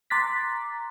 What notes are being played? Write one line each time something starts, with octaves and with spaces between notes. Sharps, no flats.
A#5 C6 D6 F#6 A6 B6